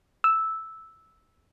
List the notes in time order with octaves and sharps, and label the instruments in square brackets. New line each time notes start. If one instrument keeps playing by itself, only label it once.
[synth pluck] E6